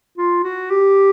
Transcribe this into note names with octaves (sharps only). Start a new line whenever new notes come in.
F4
F#4
G4